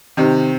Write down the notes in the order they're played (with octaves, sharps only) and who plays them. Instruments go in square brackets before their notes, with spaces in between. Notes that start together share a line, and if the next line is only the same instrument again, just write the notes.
[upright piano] C3 D#3